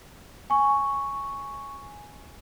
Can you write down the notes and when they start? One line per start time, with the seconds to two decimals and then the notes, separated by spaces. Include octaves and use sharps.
0.50 G#5 C#6